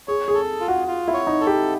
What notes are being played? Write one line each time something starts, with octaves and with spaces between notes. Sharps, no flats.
G#4 C#5
G#4
A4
F4
F#4
F4
E4
C#5
D#4
A4
G4